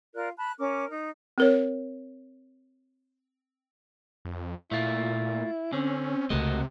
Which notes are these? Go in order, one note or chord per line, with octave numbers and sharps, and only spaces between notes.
F4 A#4 D5 F#6
A5 B5 F#6
C#4 A#4 D6
D#4 A#5
C4 A#4 C#5
F2
A#2 A3 E4 F4
D3 C4 C#4
C#2 C3 A3 F#4 A#4 D#5